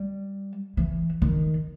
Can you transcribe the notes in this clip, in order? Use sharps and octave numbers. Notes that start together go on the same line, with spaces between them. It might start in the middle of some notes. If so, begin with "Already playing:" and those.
Already playing: G3
E3
D#3